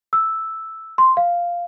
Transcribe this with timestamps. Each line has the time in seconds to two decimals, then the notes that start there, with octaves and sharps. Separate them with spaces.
0.13 E6
0.98 C6
1.17 F5